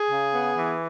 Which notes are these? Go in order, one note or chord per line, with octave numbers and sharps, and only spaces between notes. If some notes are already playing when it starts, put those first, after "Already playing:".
Already playing: G#4
C#3
B3
E3